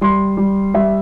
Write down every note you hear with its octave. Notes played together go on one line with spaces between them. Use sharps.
G3 C6
G3
G3 E5